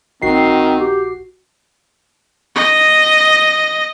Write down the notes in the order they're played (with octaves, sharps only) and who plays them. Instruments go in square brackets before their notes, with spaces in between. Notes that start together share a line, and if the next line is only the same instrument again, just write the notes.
[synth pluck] A#1 F#4 C7 [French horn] D#3 [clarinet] C4
[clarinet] G4
[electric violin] D#5